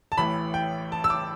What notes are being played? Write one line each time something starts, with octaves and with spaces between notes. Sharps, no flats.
A5
A1 A2 E3 B5
G5
A5
E6
D6